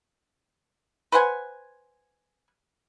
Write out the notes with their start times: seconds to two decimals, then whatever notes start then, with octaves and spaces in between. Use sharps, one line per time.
1.12 B4 C5 F#5 G#5